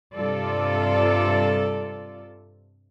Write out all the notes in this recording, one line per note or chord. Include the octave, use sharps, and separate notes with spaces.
G2 C3 F4 A4 D5